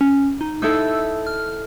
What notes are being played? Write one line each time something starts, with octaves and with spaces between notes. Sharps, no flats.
C#4
D#4
D#4 E4 A4 E6
F6